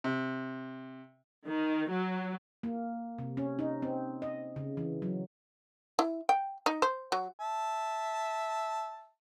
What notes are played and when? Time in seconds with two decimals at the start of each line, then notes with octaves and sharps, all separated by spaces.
0.04 C3
1.46 D#3
1.90 F#3
2.63 A#3
3.19 C3
3.37 C#4
3.59 D#4
3.82 C4
4.22 D#5
4.56 C#3
4.77 E3
5.02 F#3
5.99 E4
6.29 G5
6.66 D#4
6.82 C5
7.12 F#3
7.40 E5 A5